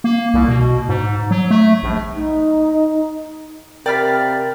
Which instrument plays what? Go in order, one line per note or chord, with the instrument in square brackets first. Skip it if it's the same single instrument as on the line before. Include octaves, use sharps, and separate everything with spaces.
[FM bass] A#3
C2
B2
G#2
F#3
A3
A#1
[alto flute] D#4
[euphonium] C3 [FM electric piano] A#4 F6 [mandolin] D5 F5 B5 [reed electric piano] G5 A6